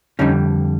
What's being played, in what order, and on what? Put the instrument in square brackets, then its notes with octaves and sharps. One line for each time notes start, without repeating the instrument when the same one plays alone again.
[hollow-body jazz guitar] F2 D3 G3 C#4 D#4